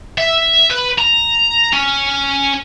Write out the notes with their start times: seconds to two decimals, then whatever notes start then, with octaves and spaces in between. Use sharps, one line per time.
0.18 E5
0.71 B4
0.99 A#5
1.73 C#4